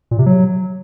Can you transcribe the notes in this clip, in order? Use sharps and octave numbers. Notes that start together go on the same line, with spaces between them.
A#2
C3
F#3